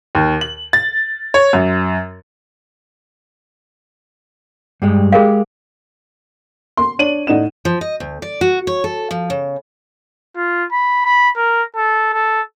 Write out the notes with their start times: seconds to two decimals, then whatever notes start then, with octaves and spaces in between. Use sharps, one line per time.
0.15 D#2
0.41 F#7
0.73 A6
1.34 C#5
1.53 F#2
4.82 G2 G3 G#3
5.12 G#3 G4 G#4 A#4 F5
6.77 C6
6.99 D4 C#5 D#7 F#7
7.27 A2 D#4 D5 F#5 E7
7.65 F3
7.81 D#5
8.00 D2
8.22 D5
8.41 F#4
8.67 C#5
8.84 A4
9.11 F3
9.30 C#3
10.36 F4
10.72 B5
11.05 B5
11.36 A#4
11.76 A4
12.13 A4